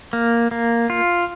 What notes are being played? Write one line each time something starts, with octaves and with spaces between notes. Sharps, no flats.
A#3
A#3
F4